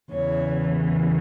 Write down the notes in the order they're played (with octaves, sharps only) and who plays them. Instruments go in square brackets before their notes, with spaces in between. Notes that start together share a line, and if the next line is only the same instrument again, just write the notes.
[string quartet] E2 C#3 E3 C#5